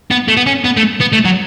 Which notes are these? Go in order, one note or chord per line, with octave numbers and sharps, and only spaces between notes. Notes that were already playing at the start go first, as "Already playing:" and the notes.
B3
A3
B3
C#4
B3
A3
B3
A3
F#3